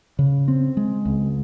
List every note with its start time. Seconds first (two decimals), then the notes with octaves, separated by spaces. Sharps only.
0.19 C#3
0.48 C4
0.77 G#3
1.05 C#2